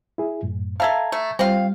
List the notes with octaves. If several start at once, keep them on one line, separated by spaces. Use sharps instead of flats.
E4 G#4
F#2 A2
A4 E5 F5 A5 A#5 G#6
A3
G3 C4 F4 F5